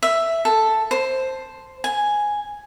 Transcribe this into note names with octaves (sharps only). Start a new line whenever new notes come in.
E5
A4
C5
G#5